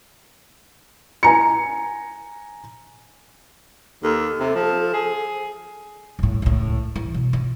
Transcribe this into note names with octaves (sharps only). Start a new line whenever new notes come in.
G#5 A#5 C#7
D#2 A4
C3
F3
G#4
D#1 A2
C#2 A2
E3
B2
F4